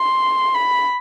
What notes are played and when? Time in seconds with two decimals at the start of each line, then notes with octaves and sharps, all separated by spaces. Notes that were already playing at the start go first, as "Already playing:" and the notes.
Already playing: C6
0.55 B5